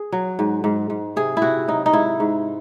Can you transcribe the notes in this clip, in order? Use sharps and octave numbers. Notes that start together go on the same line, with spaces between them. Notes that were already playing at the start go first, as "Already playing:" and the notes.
Already playing: G#4
F#3
G#2
G#2
G#2
C3 G#4
E4
C3 F#4
F#3 D#4
D#4
G#2 E4
G#2